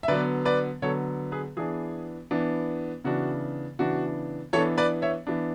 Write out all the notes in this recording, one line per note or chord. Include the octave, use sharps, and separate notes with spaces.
E5
D3 F#3 B3 B4 D5
B4 D5
D3 F#3 B3 A4 C#5
G#4 B4
E3 B3 D4 G#4
E3 B3 D4
C#3 E3 B3 D4 F#4
C#3 E3 B3 D4 F#4
E3 B3 D4 A4 C#5
B4 D5
C#5 E5
E3 B3 D4